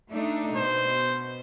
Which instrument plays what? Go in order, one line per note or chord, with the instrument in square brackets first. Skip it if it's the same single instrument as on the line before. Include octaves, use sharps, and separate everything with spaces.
[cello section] A3 D4 D#4
[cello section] B2 [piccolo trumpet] C5